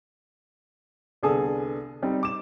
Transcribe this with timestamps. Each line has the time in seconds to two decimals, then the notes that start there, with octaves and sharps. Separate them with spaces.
1.23 C2 D3 B3 G#4 A4 D#6
2.03 G3 C4 D#4
2.23 D6 E7